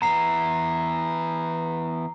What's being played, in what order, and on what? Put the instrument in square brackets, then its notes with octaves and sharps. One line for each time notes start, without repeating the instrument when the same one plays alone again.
[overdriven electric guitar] E3 B3 [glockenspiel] A#5 C7